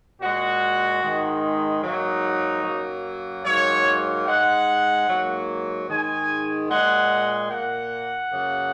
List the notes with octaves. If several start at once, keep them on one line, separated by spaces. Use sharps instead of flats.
A#2 G#3 F#4
G#2 D#3 G#3
G#2 F#3 A#3 D#4
F#2 F#3 A#3
G#2 F#3 A#3 C#5
G#2 G#3 F#5
G#2 F#3 A#3
G#2 D#3 G#3 G#5
A#2 G#3 F#5
A#2 A#3 F#5
F#2 C#3 A#3